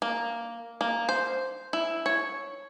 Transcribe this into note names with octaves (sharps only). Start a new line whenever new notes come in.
A#3
A#3
C5
E4
C#5